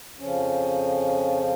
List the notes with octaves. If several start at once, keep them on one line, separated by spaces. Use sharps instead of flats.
F2 C#3 F3 C#4